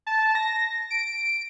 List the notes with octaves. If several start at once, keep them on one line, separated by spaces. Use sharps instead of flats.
A5
A#6
D7